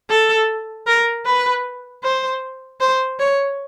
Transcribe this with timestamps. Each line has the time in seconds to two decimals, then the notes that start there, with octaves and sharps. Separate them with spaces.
0.10 A4
0.87 A#4
1.26 B4
2.03 C5
2.81 C5
3.19 C#5